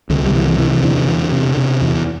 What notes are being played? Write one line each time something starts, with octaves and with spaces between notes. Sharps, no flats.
C2 D3
G3
C3 E3
E3
C3 E3
E3
E2 D3
E2
C3
C3
E2